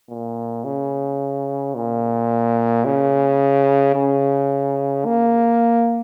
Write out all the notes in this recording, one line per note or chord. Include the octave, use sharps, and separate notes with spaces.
A#2
C#3
A#2
C#3
C#3
A#3